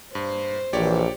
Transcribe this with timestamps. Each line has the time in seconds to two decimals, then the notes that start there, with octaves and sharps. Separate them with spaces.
0.15 G2 C5
0.73 A#1 E3 G4 C#5 D5